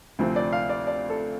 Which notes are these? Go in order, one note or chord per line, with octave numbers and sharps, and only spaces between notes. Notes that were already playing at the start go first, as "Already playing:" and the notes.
D2 C3 F3 C4
D5
F5
D5
D5
A4